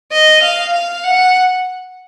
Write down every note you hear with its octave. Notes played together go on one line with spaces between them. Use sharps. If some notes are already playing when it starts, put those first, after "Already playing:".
D#5
F5
F5
F#5